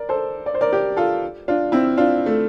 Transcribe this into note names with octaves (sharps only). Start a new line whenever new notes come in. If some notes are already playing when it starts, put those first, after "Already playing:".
Already playing: A#4 D5
A4 C5
D5
C5
A#4 D5
G4 A#4
F4 A4
D4 F4
C4 E4
D4 F4
A3